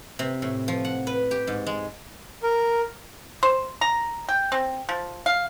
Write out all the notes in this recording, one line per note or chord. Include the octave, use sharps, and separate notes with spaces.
C3
A2
F3
F#5
B4
G4
G#2
G#3
A#4
C5
A#5
G5
C4
F3
F5